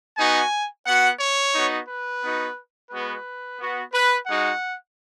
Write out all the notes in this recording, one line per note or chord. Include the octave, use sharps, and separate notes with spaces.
B3 D#4 F#4 G#5
B3 F#4 F#5
C#5
B3 D#4 F#4
B4
B3 D#4 F#4
G#3 B3 F#4 B4
B3 F#4
B4
G#3 D#4 F#4 F#5